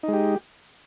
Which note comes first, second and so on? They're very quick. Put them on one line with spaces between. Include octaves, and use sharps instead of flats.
D#4 G#3 G4